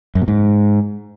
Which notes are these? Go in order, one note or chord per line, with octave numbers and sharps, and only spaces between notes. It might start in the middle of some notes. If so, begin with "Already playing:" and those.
F#2
B2
G#2